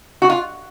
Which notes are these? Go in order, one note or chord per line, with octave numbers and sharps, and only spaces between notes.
F#4
F4